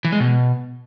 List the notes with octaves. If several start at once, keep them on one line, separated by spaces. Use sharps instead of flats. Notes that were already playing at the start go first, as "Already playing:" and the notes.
E3
G#3
B2